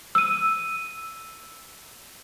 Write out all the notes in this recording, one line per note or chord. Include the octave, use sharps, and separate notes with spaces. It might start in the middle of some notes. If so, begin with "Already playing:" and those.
E6 D#7